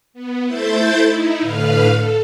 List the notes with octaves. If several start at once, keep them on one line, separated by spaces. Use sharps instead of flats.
B3
A3 E4 C5 G6 A6
D#4 E4
A2 D3 B4 F5 F6
A4